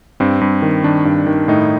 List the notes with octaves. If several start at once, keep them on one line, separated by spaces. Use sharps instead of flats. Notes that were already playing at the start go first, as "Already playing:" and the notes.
G2 C4
G2
D#3
D#3 D4
G2
D#3
A2 D#4